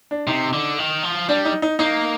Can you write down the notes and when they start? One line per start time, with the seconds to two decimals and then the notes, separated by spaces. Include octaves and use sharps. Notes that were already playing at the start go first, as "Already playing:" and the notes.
0.11 D4
0.27 C3 D#4
0.53 D3
0.79 D#3
1.03 F3
1.29 G3 D4
1.45 D#4
1.62 D#4
1.79 A#3 D#4